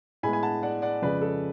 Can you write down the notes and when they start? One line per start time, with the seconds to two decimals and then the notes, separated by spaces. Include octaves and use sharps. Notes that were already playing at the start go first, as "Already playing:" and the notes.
0.23 A2 G#3 B3 G#5 B5
0.33 G#5
0.43 F#5 A5
0.63 D5 F#5
0.82 D5 F#5
1.02 F2 C#3 G#3 B4 D5
1.22 A4